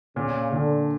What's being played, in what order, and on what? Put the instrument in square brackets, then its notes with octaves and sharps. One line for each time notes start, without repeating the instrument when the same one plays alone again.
[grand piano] A#2 [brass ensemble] C#3
[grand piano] A#2 [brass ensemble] D3